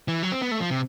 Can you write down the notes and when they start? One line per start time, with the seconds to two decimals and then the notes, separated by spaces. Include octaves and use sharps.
0.08 E3
0.23 F#3
0.32 C4
0.42 B3
0.51 A3
0.60 F3
0.71 C3